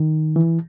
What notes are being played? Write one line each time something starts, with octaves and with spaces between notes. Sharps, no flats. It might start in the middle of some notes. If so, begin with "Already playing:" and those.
Already playing: D#3
E3